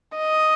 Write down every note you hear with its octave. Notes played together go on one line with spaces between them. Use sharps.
D#5